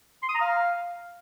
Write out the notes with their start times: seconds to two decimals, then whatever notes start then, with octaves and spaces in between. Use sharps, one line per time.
0.23 C6
0.29 D#6
0.35 A#5
0.41 F5